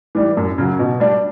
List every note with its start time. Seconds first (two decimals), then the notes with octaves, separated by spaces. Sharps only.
0.15 E3 G3
0.37 F#2
0.58 C#3 F#3
0.79 B2
1.00 G3 D4